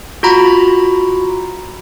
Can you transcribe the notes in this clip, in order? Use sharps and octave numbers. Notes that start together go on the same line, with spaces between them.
F4 F#4 A#5 B5